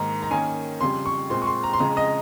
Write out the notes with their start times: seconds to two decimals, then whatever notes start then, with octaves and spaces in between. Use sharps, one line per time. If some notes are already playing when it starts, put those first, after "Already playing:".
Already playing: G#2 D#3 A#3 A#5
0.23 A#5
0.31 D#3 A#3 C#4 G#5
0.81 F2 C#3 G3 C6
1.06 C#6
1.30 A#2 G#3 C4 C6
1.42 C#6
1.47 C6
1.63 A#5
1.73 C6
1.79 F2 C#3 G#3 A#5
1.97 D#5